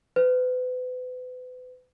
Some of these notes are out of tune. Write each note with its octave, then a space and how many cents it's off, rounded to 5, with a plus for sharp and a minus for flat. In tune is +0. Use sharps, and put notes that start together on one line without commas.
B4 +35